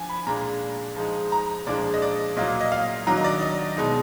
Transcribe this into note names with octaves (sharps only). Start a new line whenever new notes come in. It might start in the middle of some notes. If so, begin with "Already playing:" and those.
Already playing: F3 D4 G#5
B5
A#2 G#3 D4 A#5
F3 G#3 D#4
A#5
A#2 F3 G#3 D4 D5
D#5
D5
A#2 F#3 A#3 D#5
D#5
F5
D#3 F#3 D4 A#5
D#5
D5
D#5
B2 G#3 D#4